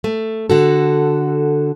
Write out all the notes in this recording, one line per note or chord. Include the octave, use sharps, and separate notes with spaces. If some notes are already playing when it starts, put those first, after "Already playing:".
A3
D3 F#4 A4